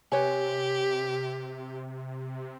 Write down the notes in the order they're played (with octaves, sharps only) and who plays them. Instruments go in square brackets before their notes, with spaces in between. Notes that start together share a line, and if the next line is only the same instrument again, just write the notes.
[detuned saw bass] C3 [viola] G4 [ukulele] B4 C#5 G#5